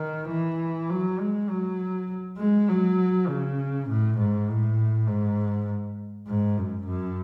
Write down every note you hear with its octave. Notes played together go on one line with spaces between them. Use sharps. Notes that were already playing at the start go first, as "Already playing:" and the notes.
Already playing: D#3
E3
F#3
G#3
F#3
G#3
F#3
C#3
A2
G#2
A2
G#2
G#2
F#2
F#2